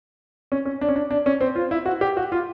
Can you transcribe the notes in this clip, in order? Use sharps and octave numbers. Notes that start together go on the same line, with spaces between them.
C#4
C#4
D4
C#4
D4
D4
C#4
C4
F4
E4
F#4
G4
F#4
F4